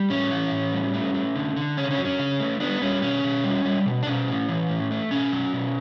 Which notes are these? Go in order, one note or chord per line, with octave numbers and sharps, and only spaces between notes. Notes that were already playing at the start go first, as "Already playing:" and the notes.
Already playing: G3
A2 C#4
E3
A2
G3
A3
A3
D3
D3
C#3 C#4
C#4
F#3
C#4
C#3
A3
G3 B3 D4
G3 C#4
B2 C#4
B2
G3
G3
B2
D4
B2 C#4
A2
E3
A2
A3
B2 C#4
F#3
B2